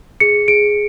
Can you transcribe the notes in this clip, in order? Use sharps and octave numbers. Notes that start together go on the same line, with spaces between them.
G#4 C#7
G#4 D7